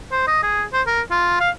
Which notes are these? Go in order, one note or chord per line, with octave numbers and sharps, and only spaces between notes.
C5
D#5
G#4
C5
A#4
F4
F5